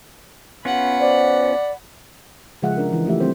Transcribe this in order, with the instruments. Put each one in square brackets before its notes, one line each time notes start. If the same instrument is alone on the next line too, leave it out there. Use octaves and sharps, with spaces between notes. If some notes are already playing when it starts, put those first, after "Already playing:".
[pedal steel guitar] B3 C#4 F4 [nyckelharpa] F#5 B5
[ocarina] C5 [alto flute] D5
[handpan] C#3 F3 G#3 G#4 E5 F#5
D4 A#4
E3
F3 A3 G4 E5
G3 C4 C5